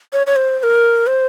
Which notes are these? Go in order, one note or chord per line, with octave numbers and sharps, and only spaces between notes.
C#5
C#5
C5
C5
A#4
C5